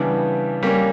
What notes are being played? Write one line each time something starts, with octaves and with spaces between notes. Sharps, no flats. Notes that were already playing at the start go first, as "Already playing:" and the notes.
Already playing: C#3 E3 G3 B3 D4
G3 A#3 C#4